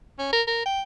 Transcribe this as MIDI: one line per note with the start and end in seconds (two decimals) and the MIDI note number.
0.19 0.32 61
0.33 0.42 70
0.47 0.63 70
0.66 0.81 79